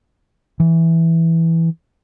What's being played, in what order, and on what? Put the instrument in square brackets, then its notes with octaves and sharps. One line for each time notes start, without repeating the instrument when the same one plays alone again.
[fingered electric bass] E3